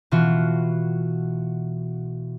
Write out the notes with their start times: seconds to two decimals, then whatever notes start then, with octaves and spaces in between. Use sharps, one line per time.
0.11 B2 E3 F4 F#4